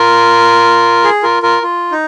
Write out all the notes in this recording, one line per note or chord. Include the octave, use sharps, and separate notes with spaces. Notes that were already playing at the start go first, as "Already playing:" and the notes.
Already playing: F4 A#4
G#4
F4 A#4
F4 A#4
F4
D#4